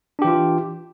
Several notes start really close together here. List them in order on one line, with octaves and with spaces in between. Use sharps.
D4 G4 E3 F4